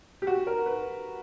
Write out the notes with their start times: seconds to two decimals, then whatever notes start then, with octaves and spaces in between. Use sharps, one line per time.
0.22 G4
0.27 F#4
0.47 A#4
0.66 B4